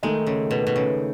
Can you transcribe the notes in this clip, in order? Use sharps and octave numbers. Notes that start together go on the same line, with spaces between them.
D#3 G#3 A3 D#4
C#3
B2
B2
C#3